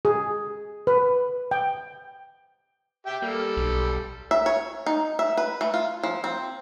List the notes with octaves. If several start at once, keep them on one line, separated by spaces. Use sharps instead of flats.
G#4
B4
G5
G4 E5 G5
G3 A#3 A4
B1
E5
C#5
D#4
E5
B4
A3
F4
F3
C4